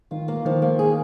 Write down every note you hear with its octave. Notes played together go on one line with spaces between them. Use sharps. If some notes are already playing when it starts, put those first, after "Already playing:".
D#3 F4
A#3
D#3 F3
A#3
G#4